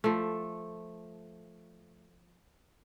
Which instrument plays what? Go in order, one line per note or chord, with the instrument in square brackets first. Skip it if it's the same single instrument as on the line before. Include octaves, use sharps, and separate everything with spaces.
[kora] F3 A3